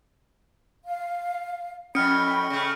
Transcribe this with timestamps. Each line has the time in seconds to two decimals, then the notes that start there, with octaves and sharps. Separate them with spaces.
0.87 F5
1.95 F2 A2 C#4 D#5 G5 B5 F6 C#7
2.50 C#3 A3